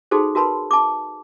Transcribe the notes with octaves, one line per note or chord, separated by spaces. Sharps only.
D#4 F#4 G#4 A4 C5
F#4 A#4 B4 A5 B5 C6
A5 D6